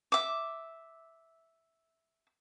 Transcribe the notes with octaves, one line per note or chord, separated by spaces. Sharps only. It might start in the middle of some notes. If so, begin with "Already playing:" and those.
E5 D6